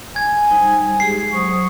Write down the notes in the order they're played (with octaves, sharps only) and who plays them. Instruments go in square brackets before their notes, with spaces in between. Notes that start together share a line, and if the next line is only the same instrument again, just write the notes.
[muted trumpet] G#5 [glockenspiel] G#6
[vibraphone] G3 D#4 C5
[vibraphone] G#3 G4 G#4 [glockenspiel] C7
[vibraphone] F#3 C5 D#6 [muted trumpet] C#6